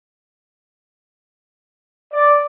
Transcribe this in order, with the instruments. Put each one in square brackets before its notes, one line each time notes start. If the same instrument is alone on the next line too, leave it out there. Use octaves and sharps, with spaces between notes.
[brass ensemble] D5